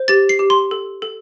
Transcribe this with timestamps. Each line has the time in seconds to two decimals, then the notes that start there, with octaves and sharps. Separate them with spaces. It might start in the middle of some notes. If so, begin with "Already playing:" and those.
Already playing: C5
0.08 G4 A6
0.29 C7
0.39 G4
0.50 C6
0.71 A4
1.02 A4